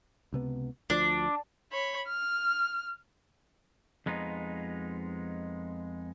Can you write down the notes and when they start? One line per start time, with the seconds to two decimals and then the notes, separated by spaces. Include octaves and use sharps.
0.33 C#2 C3 B3
0.90 D2 F3 D4
1.72 C#5 B5
2.08 F6
4.06 F2 G#3 B3 D#4 F4